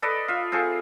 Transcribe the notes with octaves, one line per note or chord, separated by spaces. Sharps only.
A4 B4 D5 D#5
F4 E5
C4 F4 G#4 A4